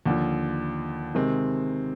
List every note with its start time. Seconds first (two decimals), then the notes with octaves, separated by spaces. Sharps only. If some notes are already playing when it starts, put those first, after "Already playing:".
0.06 D#2 D3 F3
1.15 C3 D#3 G#3 C4